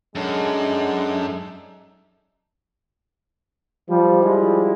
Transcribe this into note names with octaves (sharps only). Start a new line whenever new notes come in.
F#2 G#3 D4 D#4 A4
F3 G3
F3 G3 G#3 E4